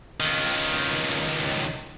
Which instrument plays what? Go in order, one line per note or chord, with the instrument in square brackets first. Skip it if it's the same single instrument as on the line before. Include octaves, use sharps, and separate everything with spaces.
[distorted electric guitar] C#2 D#3